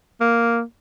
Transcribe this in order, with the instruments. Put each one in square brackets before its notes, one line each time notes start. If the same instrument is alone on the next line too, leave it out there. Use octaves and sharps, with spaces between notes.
[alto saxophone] A#3